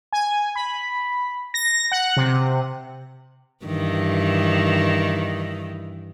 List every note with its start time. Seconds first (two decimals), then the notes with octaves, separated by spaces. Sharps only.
0.13 G#5
0.56 B5
1.54 A#6
1.92 F#5
2.17 C3
3.66 G2 D#3 E3